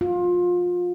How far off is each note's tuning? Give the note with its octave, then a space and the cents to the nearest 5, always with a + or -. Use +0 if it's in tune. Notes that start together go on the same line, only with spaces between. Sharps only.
F4 +25